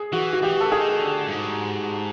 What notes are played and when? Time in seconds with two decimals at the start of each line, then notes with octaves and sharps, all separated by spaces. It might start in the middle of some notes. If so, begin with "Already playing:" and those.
Already playing: G#4
0.12 E3 F#4
0.33 F#4
0.42 E3 G4
0.60 A4
0.71 D#3 G#4
1.01 D3
1.27 G2
1.31 G#2